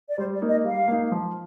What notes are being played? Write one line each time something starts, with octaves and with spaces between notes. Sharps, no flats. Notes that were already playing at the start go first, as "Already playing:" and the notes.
D5
G3 C5
D5
A#3 D#4
D#5
G3 F5
A#3 D#4
F3